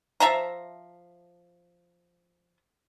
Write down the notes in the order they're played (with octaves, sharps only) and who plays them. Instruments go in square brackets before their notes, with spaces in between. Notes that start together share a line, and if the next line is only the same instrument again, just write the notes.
[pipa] F3 E5 A5 A#5